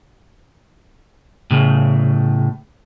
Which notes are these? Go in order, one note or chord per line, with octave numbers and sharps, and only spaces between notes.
A2 C#3